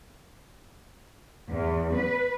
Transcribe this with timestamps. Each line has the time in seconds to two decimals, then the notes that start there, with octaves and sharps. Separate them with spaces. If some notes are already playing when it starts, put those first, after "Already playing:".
1.49 E2
1.93 B4